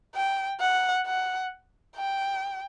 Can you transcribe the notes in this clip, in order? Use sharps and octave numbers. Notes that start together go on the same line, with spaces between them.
G5
F#5
F#5
G5